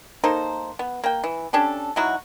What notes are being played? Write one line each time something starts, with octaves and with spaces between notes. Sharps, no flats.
A#3 D#4 A4 C5
B3
A#3 G5
E3
C#4 D4 G4 A4
F#3 D#4 E4 F#4